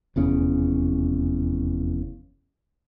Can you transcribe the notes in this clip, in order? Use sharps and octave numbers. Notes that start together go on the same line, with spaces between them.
F1 E2 C#3